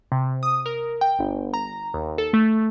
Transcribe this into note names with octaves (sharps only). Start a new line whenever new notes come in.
C3
D#6
A#4
G5
G1
A#5
D#2
A4
A3